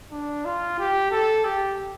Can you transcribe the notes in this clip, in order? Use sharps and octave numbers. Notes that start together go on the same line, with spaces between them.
D4
F4
G4
A4
G4